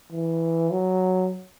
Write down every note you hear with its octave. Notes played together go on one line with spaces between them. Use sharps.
E3
F#3